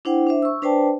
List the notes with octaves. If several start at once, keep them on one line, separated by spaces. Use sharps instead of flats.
D4 E4 C5 F#5 G5
D4 C5 E5
C#6 E6
D4 B4 C5 D5 G5 A5